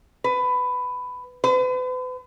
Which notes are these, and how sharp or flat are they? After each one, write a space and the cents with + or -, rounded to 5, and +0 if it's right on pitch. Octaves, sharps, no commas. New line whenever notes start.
B4 +15
B4 +40